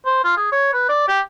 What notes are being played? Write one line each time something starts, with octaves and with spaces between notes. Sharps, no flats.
C5
F4
G#4
C#5
B4
D5
G4